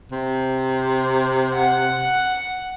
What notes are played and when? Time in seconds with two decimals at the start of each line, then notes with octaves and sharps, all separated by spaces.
0.12 C3
1.56 F#5